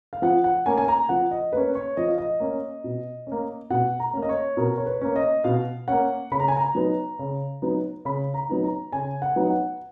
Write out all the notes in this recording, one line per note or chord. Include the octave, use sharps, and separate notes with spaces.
F5
F3 F#5
F#5
A#3 C#4 G#5
G#5
A#5
F3 F#5
D#5
A#3 C#4 B4
C#5
F3 D#5
F5
D#5
A#3 C#4
B2
C#4
A#3
B2 F#5
A#5
A#3 C#4
D#5
C#5
B2 A#4
C#5
B4
A#3 C#4
D#5
B2 F5
A#3 C#4 F#5
C#3 B5
A#5
G#5
A#5
F#3 B3 D#4
C#3
F#3 B3 D#4
C#3 B5
A#5
F#3 B3 D#4
A#5
C#3 G#5
F#5
F#3 B3 D#4
F#5